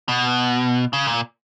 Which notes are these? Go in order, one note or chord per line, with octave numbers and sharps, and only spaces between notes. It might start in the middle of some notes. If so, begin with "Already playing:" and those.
B2
C#3
A#2